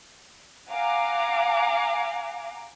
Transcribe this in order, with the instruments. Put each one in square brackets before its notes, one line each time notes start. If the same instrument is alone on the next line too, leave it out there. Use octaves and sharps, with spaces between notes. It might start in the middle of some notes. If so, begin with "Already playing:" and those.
[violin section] F5 F#5 G#5 A#5 D6